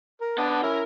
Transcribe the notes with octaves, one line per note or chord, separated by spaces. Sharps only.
A#4
B3 D4 F#5 A5
C#4 E4 A#4